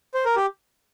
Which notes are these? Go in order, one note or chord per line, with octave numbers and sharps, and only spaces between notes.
C5
A#4
G4